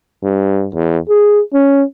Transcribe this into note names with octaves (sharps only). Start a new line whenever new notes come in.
G2
E2
G#4
C#4